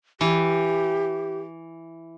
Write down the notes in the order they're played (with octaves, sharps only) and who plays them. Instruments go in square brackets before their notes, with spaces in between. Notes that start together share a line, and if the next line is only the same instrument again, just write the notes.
[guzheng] E3 [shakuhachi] G4